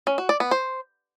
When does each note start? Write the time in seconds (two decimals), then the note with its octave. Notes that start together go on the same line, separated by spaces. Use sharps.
0.07 C#4
0.18 F#4
0.29 D5
0.40 B3
0.51 C5